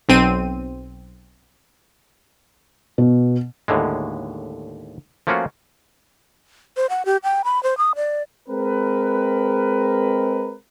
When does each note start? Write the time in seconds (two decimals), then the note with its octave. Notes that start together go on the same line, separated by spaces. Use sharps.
0.09 B1 C4 D#7
2.98 B2
3.68 D#2 A2 D3 G#3
5.27 F3 A3 A#3 C#4 F4 F#4
6.77 C5
6.90 F#5
7.05 G4
7.24 G5
7.45 B5
7.63 C5
7.78 D#6
7.96 D5
8.49 G#3 C4 A#4 B4